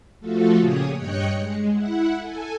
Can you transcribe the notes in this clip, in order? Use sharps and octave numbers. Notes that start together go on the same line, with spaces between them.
F3 A3 F4 F#4 A4
A#2 C#3 G4 G#4 C#5 D#6
G2 C#5 D#5 G5 F#6 C#7
G#3
E4 F#5
A4 G#5